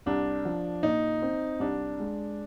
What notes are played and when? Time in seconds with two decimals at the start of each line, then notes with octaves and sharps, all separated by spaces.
0.06 C2 D4
0.45 F3
0.83 A#2 D#4
1.22 C4
1.60 C2 D4
1.99 G#3